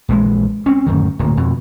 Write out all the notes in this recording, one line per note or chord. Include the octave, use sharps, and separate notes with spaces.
A#1 E3 G#3
C4 C#4
D1 F#2 D#3
D1 A#2
F2 B2